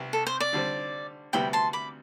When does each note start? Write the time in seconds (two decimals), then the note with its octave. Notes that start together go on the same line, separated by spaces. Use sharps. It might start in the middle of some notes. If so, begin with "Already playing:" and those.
Already playing: C2 C3 B3
0.13 A4
0.27 C5
0.40 D5
0.53 D3 G3 C4
1.33 D2 C3 G3 B3 E4 G5 B5
1.53 A5 C6
1.73 B5 D6